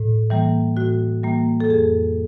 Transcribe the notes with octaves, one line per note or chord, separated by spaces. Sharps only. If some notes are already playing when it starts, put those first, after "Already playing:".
Already playing: A2
E3 G3 A#3
A2 F#4
E3 G3 A#3
A4
F2 G#4